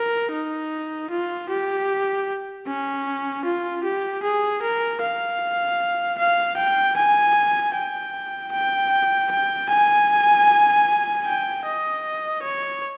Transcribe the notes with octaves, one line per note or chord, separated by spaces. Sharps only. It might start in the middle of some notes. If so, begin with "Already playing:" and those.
Already playing: A#4
D#4
F4
G4
C#4
F4
G4
G#4
A#4
F5
F5
G5
G#5
G5
G5
G5
G#5
G5
D#5
C#5